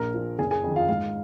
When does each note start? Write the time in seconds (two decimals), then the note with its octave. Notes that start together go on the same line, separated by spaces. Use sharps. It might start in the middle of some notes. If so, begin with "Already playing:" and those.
Already playing: A#1 A#4 A#5
0.14 A#2 F3
0.39 F#1 G#4 G#5
0.51 G#4 G#5
0.64 F2 D#3
0.76 F4 F5
0.88 G#2 F4 F5